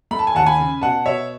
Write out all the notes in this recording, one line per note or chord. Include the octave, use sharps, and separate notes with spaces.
A3 B5
A5
G#5
D#2 F#5 A5
G#5 B5
C#3
B2 F#5 A5
B2 C#5 E5